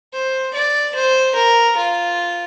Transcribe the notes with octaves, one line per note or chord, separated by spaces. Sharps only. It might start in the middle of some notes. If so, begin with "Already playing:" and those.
C5
D5
C5
A#4
F4